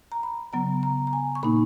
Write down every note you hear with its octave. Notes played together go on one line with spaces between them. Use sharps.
A#5
B5
C#3 F#3 B3 A#5
A#5
A#5
G#5
C#6
A#2 A#3 D#4 B5